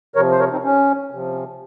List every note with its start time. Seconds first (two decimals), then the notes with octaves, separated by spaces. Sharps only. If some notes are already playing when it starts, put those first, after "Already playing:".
0.16 C3 F3 A#4 C#5
0.31 C5
0.40 A#4 C#5
0.52 C4 D#4
0.64 C#4
1.11 C3 F3